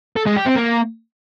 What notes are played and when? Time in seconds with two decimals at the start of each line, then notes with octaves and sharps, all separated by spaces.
0.17 A4
0.27 G#3
0.36 G4
0.46 C4
0.56 A#3